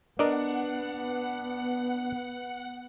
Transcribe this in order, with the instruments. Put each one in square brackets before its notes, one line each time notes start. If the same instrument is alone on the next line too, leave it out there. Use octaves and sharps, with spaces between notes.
[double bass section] B3 [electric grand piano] D4 [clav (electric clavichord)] A#4 D5 D#5 [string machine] F#5